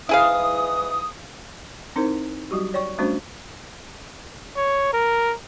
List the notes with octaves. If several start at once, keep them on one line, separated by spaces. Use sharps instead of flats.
G#2 E3 E4 G#4 F5 D#6
C4 D#4 E4 A#4 C5
F#3 G3 F#4 G4
C#5 D5 G5 C#6
G3 A3 C#4 D4 F#4 C5
C#5
A#4